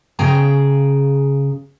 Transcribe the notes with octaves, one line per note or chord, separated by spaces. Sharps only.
C#3 G#4 G5 A#5